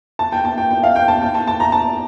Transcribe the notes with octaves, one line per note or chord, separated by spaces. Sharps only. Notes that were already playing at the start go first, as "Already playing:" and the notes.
A5
G5
A5
G5
G5
F5
G5
A5
G5
A5
A5
A#5
A5